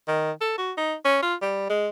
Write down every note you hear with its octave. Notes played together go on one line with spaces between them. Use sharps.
D#3
A4
F#4
D#4
C#4
F4
G3
G#3